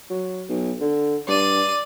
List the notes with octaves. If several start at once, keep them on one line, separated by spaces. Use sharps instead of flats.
F#3
B1
D3
G2 D5 D#7